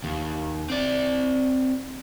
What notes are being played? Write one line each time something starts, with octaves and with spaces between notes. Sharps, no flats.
D#2
C4 D5